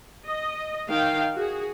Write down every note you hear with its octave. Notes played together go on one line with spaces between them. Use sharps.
D#5
D#3 F5 G5
F#4 G#4